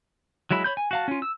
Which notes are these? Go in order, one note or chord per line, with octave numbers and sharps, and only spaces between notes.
F#3 G#3 E4 B5
C#5 B5 G6
G#5
F#4 F5 A5
C#4 F4
E6